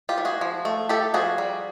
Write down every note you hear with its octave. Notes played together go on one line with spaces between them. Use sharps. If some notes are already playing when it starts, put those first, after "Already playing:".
F4 G4
E3
F#4 G#4
F3
A3
A3 G4 A4
F3 F#4 G#4
G3